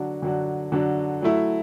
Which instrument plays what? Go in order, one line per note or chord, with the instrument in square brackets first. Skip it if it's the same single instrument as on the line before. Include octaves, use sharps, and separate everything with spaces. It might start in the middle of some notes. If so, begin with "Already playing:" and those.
Already playing: [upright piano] D3 F#3 D4 F#4
D3 F#3 D4 F#4
D3 F#3 D4 F#4
F#3 A3 E4